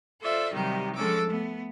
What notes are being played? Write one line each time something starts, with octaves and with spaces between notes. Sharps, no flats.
F4 A4 C5 D5 E5
C3 D#3 F#3 G3 D#4 G4
F3 G#3 C#4 A4 D6 E6
A3 B3